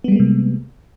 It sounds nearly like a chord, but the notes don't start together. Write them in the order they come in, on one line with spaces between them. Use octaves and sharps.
B3 G3 G#3 A#3 C3